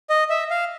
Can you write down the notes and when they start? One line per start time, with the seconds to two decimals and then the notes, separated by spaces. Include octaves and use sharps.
0.10 D#5
0.30 E5
0.50 F5